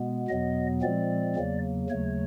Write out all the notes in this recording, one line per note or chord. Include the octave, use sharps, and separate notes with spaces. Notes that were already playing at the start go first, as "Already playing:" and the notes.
Already playing: B2 G#3 B3
E2 B2 F#3 B3 D#5
A#2 F3 G#3 C4 D5
E2 C#3 F#3 A#3
D#2 C#3 F#3 A3 C#5